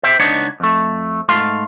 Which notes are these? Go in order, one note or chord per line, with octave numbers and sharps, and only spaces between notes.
C5 E5 G5
C#2 B3 D4 D#4 C#5 F#5
F2 A3
G#2 A3 F5 C6